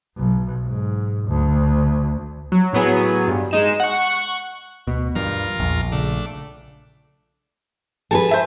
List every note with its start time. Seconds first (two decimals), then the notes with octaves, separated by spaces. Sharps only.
0.17 B1
0.65 G#2
1.28 D2
2.52 F#3
2.73 A2 F#3 B3 G#4
3.28 G2
3.51 G#3 D#4 E7
3.80 F#5 C#6
4.87 D2 B2
5.15 G2 E3 F4 A#4
5.60 A#1 E2
5.92 C#3 A3 D4
8.11 G#4 A4 B4 A5
8.31 C5 E5